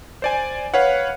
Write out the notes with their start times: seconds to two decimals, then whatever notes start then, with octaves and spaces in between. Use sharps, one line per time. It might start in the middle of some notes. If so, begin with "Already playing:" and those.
0.22 C5 D5 G#5
0.74 B4 C#5 F5 F#5